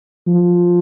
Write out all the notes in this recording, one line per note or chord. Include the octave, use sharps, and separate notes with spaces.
F3